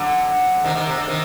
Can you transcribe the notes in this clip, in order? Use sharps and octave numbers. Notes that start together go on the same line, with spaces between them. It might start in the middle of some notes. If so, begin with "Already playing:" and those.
Already playing: D3 F#3
C3 D#3
C3 D#3
C3
D3
C3 D#3